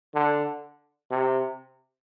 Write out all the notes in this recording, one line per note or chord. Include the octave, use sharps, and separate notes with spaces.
D3
C3